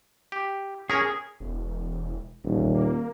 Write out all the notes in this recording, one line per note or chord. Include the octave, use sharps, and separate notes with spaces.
G4
C#4 G#4 A#4 A#5
E1
D#1 A1
A#3